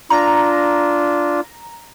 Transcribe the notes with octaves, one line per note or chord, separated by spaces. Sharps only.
D4 F4 A#5